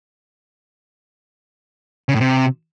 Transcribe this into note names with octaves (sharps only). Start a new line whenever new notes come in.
C#3
A2
C3